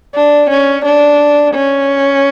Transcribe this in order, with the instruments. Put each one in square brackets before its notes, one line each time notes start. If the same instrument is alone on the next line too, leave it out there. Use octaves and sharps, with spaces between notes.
[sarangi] D4
C#4
D4
C#4